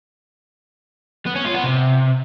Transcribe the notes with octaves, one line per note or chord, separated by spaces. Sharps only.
B3
C#4
F4
B3
C3